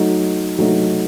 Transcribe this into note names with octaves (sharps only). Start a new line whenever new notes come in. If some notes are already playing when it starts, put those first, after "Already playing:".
Already playing: F#3 A3 D#4
F#3 A3 D#4